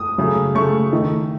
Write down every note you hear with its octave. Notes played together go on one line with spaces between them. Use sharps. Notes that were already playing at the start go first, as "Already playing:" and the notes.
Already playing: D#6
C#3 F#3 A3
C#3 F#3 A3 C#6
D#3 A3